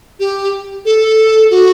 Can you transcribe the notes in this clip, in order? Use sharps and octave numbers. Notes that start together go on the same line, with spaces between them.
G4
A4
F#4